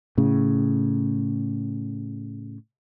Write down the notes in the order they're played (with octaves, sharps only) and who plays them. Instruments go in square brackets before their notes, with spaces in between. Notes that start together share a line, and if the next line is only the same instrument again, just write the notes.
[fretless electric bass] A2 C#3